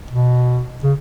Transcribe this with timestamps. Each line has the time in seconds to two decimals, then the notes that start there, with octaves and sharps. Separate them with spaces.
0.11 B2
0.83 C#3